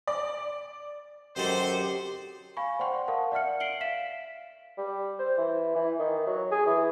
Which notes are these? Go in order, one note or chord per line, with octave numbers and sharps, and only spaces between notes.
D5
F#2 D#3 C4 G4 A4 C5
F5 G#5 B5 C#6
C5 D5 F#5 G5 C6 C#6
A#4 F5 F#5 A5
D5 E5 F#5 F6 C#7
C7 D7 F#7 G7
E5 F5 B6 E7
G3
C5
E3
E3
D#3
F#3
G#4
E3